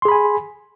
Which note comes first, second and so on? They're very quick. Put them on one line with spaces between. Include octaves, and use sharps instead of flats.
C6 G#4 B5 G#5